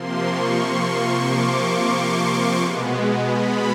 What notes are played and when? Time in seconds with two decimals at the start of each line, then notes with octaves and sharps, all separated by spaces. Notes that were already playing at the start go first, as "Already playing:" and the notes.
Already playing: C3 F3 A#3 C6
0.23 C#6
0.57 C#6
1.26 D6
1.59 C#6
1.93 C6
2.61 B2 G#3 B3
3.29 B5